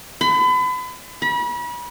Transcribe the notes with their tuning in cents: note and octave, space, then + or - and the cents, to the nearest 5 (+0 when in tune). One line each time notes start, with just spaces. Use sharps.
B5 +35
B5 -35